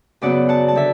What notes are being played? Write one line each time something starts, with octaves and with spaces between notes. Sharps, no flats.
F#2 C#3 F#3 B3 D5 F#5
F#5 A5
A5
D3 F#3 E5